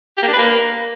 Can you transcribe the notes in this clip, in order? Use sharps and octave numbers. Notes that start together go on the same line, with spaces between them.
G4
A#3
D4
B4
A#3